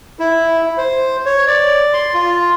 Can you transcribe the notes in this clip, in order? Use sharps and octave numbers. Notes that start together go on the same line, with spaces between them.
E4
C5
C#5
D5
C6
F4